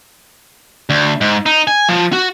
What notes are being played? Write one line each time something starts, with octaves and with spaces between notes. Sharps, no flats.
D2
G#2
D#4
G#5
F3
F#4